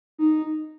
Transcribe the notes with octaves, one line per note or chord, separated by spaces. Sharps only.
D#4